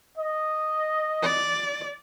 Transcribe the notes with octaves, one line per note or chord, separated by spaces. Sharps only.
D#5
D5